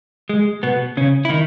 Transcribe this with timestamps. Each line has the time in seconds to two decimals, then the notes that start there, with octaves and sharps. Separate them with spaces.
0.29 G#3
0.63 B2 B3
0.97 C#3 C#4
1.25 E4
1.29 D#3 D#4